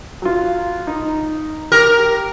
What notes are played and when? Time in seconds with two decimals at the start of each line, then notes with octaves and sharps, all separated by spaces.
0.22 F#3 F4
0.87 D#4
1.72 G4 A#4